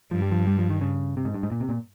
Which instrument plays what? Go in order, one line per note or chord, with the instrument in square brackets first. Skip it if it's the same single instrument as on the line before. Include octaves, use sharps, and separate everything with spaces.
[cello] G2 [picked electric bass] F3
[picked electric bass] G3
F3
G3
F3
D#3
C#3
C3
G#2
G2
G#2
A#2
C3
A#2